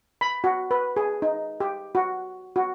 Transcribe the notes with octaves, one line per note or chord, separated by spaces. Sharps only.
B5
F#4
B4
G#4
D#4
G4
F#4
F#4